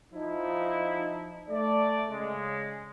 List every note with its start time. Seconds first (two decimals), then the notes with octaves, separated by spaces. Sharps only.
0.12 F3 D#4 E4
1.48 A3 D5
2.09 C#3 G#3